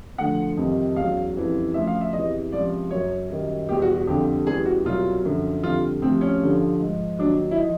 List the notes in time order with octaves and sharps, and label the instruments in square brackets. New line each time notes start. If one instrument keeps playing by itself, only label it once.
[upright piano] D2 D3 F3 F#5
F2 C3 D#3 G3
E2 C#3 F#3 F5
F2 C#3 E3 G3
D2 C#3 F3 E5
F5
E5
E2 C3 E3 D#5
C#2 C3 F3 D5
F#2 C#3 F#3 C#5
F#2 D#3 G3
E2 B2 G3 G4
F#4
F#4
F2 D3 G3 G4
E2 C#3 E3 G3 G#4
F#4
C2 B2 F#3 F4
F#2 D3 F3
F2 D3 G3 F4
D2 C3 F3 C4
C#4
G2 D3 F3
G#2 F3
D#2 D#3 F#3 D4
E4
F3 D#4